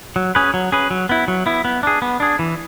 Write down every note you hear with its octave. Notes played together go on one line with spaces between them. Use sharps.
F#3
C#4 G#4 B4
F#3
C#4 G#4 B4
F#3
B3 E4
F#3
B3 E4
B3
D4 G#4
B3
D4 G#4
E3